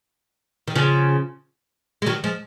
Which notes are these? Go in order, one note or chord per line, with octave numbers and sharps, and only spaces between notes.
D#3
C#3 F3
G#3
D#3 F#3
F3 G#3